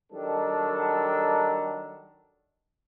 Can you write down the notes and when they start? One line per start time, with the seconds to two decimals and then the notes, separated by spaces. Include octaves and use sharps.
0.12 D#3 F#3 G3 D4 A4 A#4